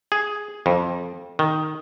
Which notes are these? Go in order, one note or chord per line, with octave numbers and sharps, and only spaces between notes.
G#4
F2
D#3